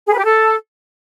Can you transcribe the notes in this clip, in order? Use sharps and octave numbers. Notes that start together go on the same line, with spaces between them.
G#4
B4
G4
A4